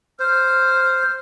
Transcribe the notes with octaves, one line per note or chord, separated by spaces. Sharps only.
C5 F6